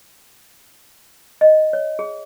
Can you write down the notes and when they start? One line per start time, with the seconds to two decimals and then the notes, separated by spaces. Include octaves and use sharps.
1.41 D#5
1.73 C#5
1.99 G#4